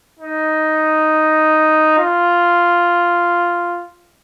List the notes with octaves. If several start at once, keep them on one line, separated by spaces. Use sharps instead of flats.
D#4
F4